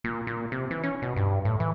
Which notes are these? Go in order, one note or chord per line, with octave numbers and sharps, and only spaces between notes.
A#2
A#2
C3
E3
C#4
B2
G2
A2
E3